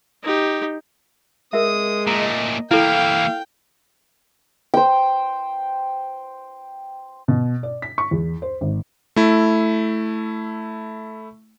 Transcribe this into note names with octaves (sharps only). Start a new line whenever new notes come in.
D#4 G4
G#3 A#4 E5 D#6
A#2 A3 D#5 A#5
E3 A#3 E4 A4 F5 G5
C5 G5
B2
D5
B6
C#6
E2
C5
G#1
A3 E4